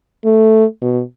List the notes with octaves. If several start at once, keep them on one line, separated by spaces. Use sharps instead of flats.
A3
B2